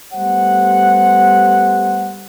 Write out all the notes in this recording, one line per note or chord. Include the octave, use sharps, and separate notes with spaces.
G3 A3 B3 G4 C5 F#5